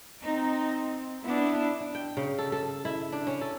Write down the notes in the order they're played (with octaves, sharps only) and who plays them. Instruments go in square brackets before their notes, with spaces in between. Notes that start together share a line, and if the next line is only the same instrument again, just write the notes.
[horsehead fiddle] C4 [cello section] D#4
[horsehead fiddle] B3 [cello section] D4 E4
[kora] D4
G5
C#3
A4
A4
E4
D4
C#4
A4